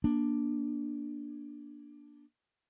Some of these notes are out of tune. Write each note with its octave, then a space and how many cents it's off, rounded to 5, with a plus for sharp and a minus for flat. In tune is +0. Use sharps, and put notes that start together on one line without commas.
A#3 +30 D4 +0